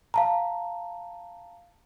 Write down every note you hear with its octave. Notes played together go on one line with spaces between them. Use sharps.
F5 A5 A#5